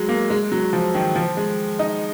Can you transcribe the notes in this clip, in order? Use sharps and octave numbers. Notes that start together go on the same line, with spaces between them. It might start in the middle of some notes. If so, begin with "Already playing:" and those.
Already playing: F#3 G#3
A#3
G#3
F#3
F3
D#3
F3
G#3
D#4